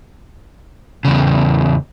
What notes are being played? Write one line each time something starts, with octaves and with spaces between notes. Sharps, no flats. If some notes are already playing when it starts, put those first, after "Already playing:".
E2 C#3